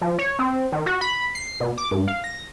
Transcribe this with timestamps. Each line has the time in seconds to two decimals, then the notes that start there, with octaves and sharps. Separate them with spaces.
0.01 F3
0.19 C#5
0.39 C4
0.72 D#3
0.86 F#4
1.01 B5
1.35 C7
1.60 B2
1.78 D6
1.91 G2
2.08 F5
2.24 A#6